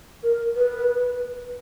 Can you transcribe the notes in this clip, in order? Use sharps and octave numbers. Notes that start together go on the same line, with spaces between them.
A#4
B4